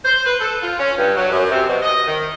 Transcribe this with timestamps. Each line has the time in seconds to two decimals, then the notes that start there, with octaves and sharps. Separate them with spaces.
0.04 C5
0.25 B4
0.41 A4
0.62 F4
0.78 C#4
0.98 G2
1.16 F#3
1.31 F#2
1.51 C3
1.68 B2
1.82 D#5
2.07 D#3